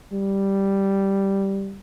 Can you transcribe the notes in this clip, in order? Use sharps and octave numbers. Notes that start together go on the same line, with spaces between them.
G3